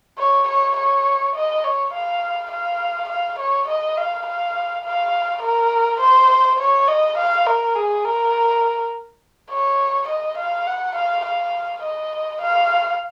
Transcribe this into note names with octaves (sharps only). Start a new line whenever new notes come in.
C#5
C#5
C#5
D#5
C#5
F5
F5
F5
C#5
D#5
F5
F5
F5
A#4
C5
C#5
D#5
F5
A#4
G#4
A#4
C#5
D#5
F5
F#5
F5
F5
D#5
F5